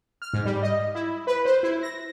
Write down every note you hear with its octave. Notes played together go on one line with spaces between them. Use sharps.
F6
G#2
G3
D#5
E4
B4
C5
E4
A#6